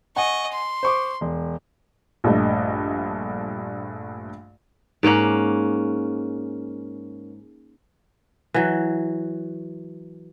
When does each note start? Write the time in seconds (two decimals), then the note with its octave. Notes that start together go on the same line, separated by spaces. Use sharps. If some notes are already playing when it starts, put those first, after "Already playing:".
0.16 D#5 F#5 G#5 C#6
0.52 C6
0.83 C5 C#6 D6
1.21 E1
2.24 A#1 G2 A3 D#5
5.03 G#2 A#3 C#4 F#5
8.54 E3 F#3